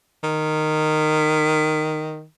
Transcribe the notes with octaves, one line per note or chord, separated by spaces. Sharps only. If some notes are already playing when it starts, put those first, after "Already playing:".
D#3